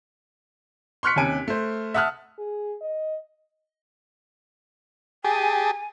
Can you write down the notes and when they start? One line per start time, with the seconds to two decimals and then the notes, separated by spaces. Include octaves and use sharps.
1.03 C6 C#6 F6 F#6 B6 C#7
1.16 D#2 C3 C#4 G#5 D7
1.48 A3 C5
1.94 E5 F#5 A5 D#6 F6 F#6
2.39 G#4
2.81 D#5
5.25 G4 G#4 G#5 A5